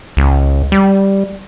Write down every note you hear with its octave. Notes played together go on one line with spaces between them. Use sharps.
C#2
G3